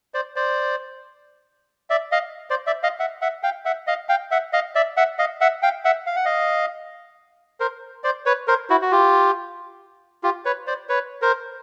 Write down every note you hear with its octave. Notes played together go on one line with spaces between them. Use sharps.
C5 D5
C5 D5
D5 E5
D#5 F5
C5 D5
D5 E5
D#5 F5
E5 F#5
E5 F#5
F5 G5
E5 F#5
D#5 F5
F5 G5
E5 F#5
D#5 F5
D5 E5
E5 F#5
D#5 F5
E5 F#5
F5 G5
E5 F#5
F5
F#5
D#5 F5
A#4 C5
C5 D5
B4 C#5
A#4 C5
E4 F#4
F#4
F4 G4
F4 G4
B4 C#5
C5 D5
B4 C#5
A#4 C5